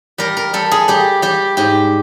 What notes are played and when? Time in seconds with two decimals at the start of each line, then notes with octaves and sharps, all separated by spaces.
0.18 G3 A#4
0.37 A#4
0.53 G3 A4
0.71 G#4
0.88 G3 G4
1.22 G3 G4
1.57 G#2 G4